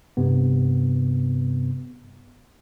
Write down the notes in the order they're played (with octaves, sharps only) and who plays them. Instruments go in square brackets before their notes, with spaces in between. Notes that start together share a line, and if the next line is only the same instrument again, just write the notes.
[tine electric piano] G2 C3 B3